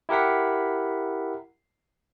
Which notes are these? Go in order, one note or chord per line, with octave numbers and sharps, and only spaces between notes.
E4 G4 A#4 F#5 B6